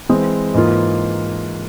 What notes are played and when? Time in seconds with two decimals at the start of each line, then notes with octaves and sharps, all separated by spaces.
0.09 E3 G#3 C4
0.54 G#2 E3 A#3 F4